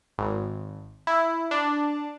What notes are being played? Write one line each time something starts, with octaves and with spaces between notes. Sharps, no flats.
G#1
E4
D4